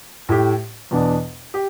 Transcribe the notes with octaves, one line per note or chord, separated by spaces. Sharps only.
A2 A3 G4
E2 B2 B3 D4
G4